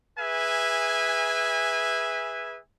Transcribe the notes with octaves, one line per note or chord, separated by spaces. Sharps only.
G#4 B4 E5 G#5